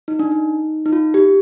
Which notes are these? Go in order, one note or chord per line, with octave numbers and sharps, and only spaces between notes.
D#4
D4
D#4
D#4
F4
G4